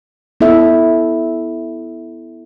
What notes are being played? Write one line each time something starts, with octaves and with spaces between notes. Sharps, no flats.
B3 E4 A4 E5